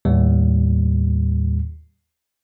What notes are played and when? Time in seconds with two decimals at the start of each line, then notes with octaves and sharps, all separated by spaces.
0.05 D#2 A2 G3